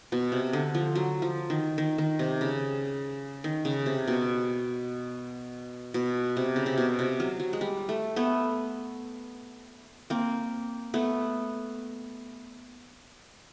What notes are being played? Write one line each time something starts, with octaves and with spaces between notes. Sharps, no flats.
B2
C3
D3
F3
F#3
F3
D#3
D#3
D#3
C3
C#3
D#3
C#3
C3
B2
B2
C3
C#3
C3
B2
C3
F#3
F#3
G#3
G3
A3
A3 B3
A#3 C4
A3 B3